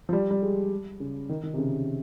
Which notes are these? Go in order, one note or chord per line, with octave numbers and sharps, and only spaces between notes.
F3
G3
G3
G#3
C#3
D#3
D#3
C3
C#3